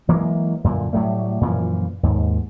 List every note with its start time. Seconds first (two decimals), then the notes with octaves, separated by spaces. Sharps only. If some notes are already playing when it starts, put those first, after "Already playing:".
0.09 E3 F#3 G#3 A#3
0.64 F#2 A#2 D3
0.93 A2 F#3 G3 A3
1.41 F#2 A#2 E3 F3
2.03 D#2 G#2